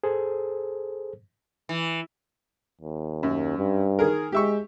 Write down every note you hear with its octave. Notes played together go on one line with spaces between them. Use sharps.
G#4 A4 C5
E3
D#2
F#2
G2
D#3 G#4 A#4
G#3 G4 E5 C#6